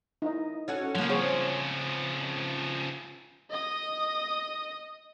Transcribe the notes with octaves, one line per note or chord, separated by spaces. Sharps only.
D#4 E4 D#5
C#4 F#4 A4
C#3 F3 F#3 A#3
C4 G#4 C#5
D#5 D#6